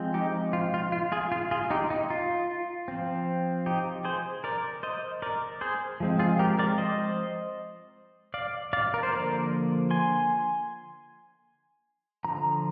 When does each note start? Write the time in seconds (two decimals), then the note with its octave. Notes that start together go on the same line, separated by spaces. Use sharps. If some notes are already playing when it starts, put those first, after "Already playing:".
Already playing: F3 G#3 C4
0.14 D#4 G4
0.53 F4
0.74 F4
0.92 F4
1.12 F4 G#4
1.32 F4
1.51 F4 G#4
1.70 D#4 G4
1.90 D#4
2.10 F4
2.88 F3 C4
3.66 D#4 G4
4.05 G#4 C5
4.44 A#4 D5
4.83 C5 D#5
5.22 A#4 D5
5.61 G#4 C5
6.00 F3 G#3 C4
6.19 F4 G#4
6.39 G4 A#4
6.59 A#4 D5
6.78 C5 D#5
8.34 D5 F5
8.73 D5 F5
8.94 A#4
9.03 C5
9.12 D3 F3 A#3 A#4 D5
9.91 G#5 C6
12.25 D3 F3 A#5